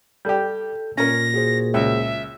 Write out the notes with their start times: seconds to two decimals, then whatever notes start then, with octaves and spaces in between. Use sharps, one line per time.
0.25 G3 G4 A4 G6
0.97 A#2 C#4 A#4 A#6
1.34 F#4 G#4 C5
1.74 C#2 E5